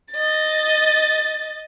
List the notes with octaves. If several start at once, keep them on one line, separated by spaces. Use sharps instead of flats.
D#5 A6